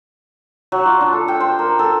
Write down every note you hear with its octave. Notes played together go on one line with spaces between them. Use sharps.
F#3
F4
D4
A4
G5
C5
A#4
A4